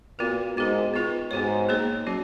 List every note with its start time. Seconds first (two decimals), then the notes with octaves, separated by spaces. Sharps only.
0.19 A#2 B3 F#4 B4
0.56 G#2 B3 F#4 A#4
0.94 B3 F4 B4
1.31 G#2 B3 F#4 C#5
1.69 A#3 D#4 G#4 C#5
2.07 F#3 C#4 F#4